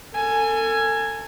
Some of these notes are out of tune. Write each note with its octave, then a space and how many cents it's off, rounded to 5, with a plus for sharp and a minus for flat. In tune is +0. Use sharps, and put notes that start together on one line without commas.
A4 +35 G#5 +0